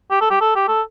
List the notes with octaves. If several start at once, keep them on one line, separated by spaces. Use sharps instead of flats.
G4
A4
G4
A4
G4
A4